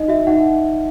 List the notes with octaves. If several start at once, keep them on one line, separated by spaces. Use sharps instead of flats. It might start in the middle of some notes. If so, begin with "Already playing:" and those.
Already playing: D#4 D#5
F#4 E5
D#4 F#5